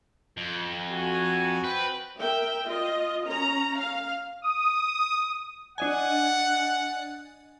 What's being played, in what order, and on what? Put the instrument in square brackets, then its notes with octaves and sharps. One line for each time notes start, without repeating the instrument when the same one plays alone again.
[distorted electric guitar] F2
[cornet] F#4 [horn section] G#5
[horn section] C4 G5 [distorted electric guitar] B4
[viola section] A#4 E5 G5
F4 D#5
C#4 A#5
F5
[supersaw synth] D#6
[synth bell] D4 D#5 G#5 [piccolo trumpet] F#5